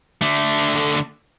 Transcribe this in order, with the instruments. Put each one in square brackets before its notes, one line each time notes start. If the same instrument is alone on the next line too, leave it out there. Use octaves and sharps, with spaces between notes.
[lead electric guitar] D3 A3